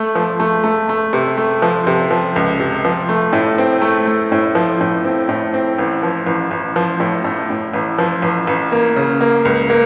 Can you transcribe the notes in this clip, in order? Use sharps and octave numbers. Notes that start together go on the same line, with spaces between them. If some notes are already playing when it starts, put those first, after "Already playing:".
Already playing: A3
F3
A3
A3
A3
C3
A3
F3
C3
F3
C#2
C3
F3
A3
A2
C4
A3
A3
A2
F3
A2
C4
A2
C4
A1
F3
A1
A1
F3
A2
A2
A2
A1
F3
A1
A1
A#3
C#3
A#3
C#2
A#3